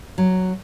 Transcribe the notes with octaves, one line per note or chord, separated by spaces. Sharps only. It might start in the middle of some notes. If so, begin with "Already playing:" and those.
F#3